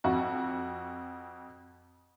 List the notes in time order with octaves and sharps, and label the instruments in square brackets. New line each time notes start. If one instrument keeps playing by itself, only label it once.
[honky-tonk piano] F2 F#4